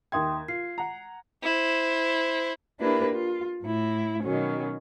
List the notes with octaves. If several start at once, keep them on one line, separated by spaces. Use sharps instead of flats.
D#2 E5 G5 C6 D#6 G#6
F4 C7
F#5 A#5
E4 C5
A#3 D4 E4 G4 A#4 B4
F4
A2 E4
B2 D#3 F#3 C#4